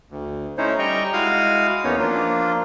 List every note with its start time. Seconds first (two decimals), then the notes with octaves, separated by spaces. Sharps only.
0.10 D2
0.58 A3 C#4 D#4 E4 C5 C#5
0.79 G3 D#5 G5 A#5 C#6
1.13 G#3 E4 F#4 F5 D#6 F6
1.84 E2 A#3 B3 C#4 D#4 C#5
1.99 F3 A#3 D4 F4